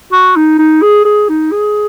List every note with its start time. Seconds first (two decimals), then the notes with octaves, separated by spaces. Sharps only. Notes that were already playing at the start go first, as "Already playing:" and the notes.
0.12 F#4
0.36 D#4
0.59 D#4
0.82 G#4
1.05 G#4
1.29 D#4
1.52 G#4